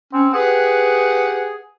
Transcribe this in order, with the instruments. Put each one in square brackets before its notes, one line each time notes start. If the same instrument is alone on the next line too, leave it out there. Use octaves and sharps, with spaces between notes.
[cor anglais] C4 [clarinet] C#4
[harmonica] G4 F#5 [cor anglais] G#4 [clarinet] B4